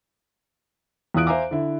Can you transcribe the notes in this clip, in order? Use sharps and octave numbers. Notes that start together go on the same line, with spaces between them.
E2 E3 F4 D#6 F#6 D7
C5 E5 F5 G#5 A#5 D6
D3 E4